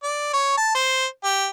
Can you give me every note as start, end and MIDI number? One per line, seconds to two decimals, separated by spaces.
0.03 0.28 74
0.33 0.56 73
0.57 0.73 81
0.75 1.06 72
1.24 1.47 67